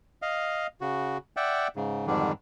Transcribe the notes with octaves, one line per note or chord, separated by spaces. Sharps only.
D#5 F5
C#3 F#4
D5 E5 F#5 G5
G#2 C#3
F2 G#2 D3 D#3 G3 D4